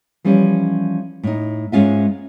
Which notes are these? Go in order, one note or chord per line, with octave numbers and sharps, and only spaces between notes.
E3 F3 G3 C#4
A2 D#4
G#2 G#3 C#4 F4 E5